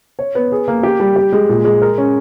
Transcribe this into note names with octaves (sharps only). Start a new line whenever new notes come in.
C#5
B3
G#4
A#3
G4
G3
G4
G#3
A#2
G#3
A#4
C#4